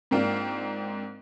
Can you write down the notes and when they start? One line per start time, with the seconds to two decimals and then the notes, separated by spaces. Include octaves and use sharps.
0.11 G#2 A#3 C4 D4 F4